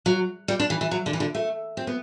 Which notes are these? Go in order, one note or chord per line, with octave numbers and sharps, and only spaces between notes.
F#3
G3
D4
E3
E3
F#3
D3
E3
D3
A3
C4
B3